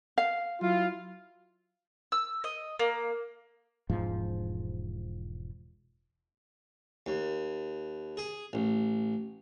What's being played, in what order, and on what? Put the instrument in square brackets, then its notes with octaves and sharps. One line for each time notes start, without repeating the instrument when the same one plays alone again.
[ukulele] F5
[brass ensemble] F#3 E4 F4
[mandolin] E6
D#5
A#3
[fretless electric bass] E1 G#2 F3
[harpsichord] D#2
G#4
A1